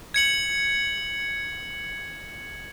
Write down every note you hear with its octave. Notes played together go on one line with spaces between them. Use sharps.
G#6 C#7 F#7